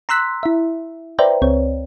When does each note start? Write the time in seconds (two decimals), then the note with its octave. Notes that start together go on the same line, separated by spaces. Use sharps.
0.09 A#5 C6 E6 F#6 B6
0.43 E4 E5
1.19 B4 C5 D5 E5 G5 A#5
1.42 C#2 C4 C#5